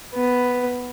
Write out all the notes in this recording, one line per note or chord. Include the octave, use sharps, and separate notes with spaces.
B3